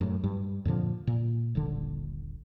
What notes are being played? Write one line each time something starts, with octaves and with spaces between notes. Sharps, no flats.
F#2 A2
G2
F2 A#2 D3 F3
A#2
D#1 A#1 D3